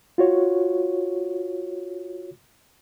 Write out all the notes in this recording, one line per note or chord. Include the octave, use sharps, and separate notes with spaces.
F4 F#4 C#5